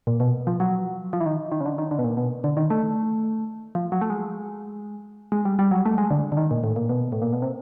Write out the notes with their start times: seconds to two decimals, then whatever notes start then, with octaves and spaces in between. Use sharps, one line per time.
0.07 A#2
0.20 B2
0.47 F3
0.60 F#3
1.13 F3
1.21 E3
1.26 D#3
1.52 D#3
1.61 C#3
1.66 D3
1.78 D#3
1.91 D3
1.99 B2
2.04 A#2
2.17 B2
2.44 D3
2.57 D#3
2.70 A3
3.75 F3
3.92 F#3
4.01 A3
4.10 G#3
5.32 G#3
5.45 G3
5.59 G3
5.71 F#3
5.86 A3
5.98 G#3
6.11 D3
6.32 D3
6.37 D#3
6.51 A#2
6.64 A2
6.76 A#2
6.89 B2
7.12 A2
7.22 A#2
7.32 B2
7.42 C3